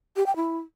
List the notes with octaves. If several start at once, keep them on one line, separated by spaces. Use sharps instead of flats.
G4
G5
E4